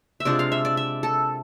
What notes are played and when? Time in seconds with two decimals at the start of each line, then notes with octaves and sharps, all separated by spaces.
0.20 E5
0.25 C3 G#3 D4 F4 D5
0.39 F5
0.52 E5
0.65 D5
0.77 E5
1.03 A4